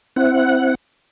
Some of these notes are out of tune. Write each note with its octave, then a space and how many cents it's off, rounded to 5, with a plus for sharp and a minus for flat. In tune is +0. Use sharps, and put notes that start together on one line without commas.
C4 +0 E4 +5 F#5 +0